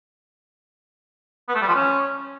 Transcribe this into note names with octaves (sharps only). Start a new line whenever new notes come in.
B3
A3
G3
F3
C#4